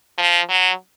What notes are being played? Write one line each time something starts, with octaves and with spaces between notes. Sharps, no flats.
F3
F#3